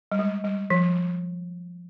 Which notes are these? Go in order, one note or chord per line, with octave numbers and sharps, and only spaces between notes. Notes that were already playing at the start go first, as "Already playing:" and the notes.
G3
G#3
G3
F3